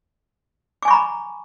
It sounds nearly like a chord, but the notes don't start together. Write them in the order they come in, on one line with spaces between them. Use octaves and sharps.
D6 G#5 C#6 B5 A#5